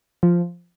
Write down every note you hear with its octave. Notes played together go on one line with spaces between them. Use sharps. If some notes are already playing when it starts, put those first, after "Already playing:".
F3